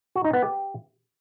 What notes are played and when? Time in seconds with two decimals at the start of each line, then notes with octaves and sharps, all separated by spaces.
0.15 F#4
0.24 D#4
0.33 B3
0.42 G4